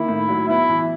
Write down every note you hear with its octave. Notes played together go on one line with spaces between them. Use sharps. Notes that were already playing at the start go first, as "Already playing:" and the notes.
Already playing: D#3 A#3 E4
A2
F#3
B3 E4
E3